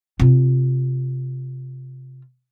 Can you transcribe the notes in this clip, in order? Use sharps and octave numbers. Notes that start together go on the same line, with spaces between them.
C3 F4